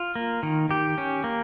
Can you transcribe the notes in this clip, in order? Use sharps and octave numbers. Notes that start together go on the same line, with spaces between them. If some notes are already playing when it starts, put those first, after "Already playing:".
Already playing: F4
A#3
D#3
D#3 G4
C#4
A#3